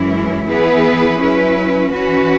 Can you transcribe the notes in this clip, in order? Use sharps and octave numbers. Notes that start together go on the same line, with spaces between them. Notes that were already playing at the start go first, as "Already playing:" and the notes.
Already playing: F#2 E3 G#3 C#4 E4
E3 B3 E4 G#4 B4
F#3 C#4 E4 B4
E3 C#4 F#4 B4